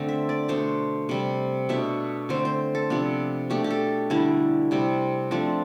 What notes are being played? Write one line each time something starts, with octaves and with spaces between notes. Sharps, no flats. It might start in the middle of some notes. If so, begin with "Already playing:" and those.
Already playing: D3 A3 C4
E5
D5
B2 A3 D4 C5
C3 G3 C4
B2 A3 D4 E5
D3 A3 C4 C5
C5
A4
C3 F3 B3 D4
B2 A3 D4 G4
G4
A4
D3 G3 D4 E4
C3 G3 C4
F3 A3 C4 D4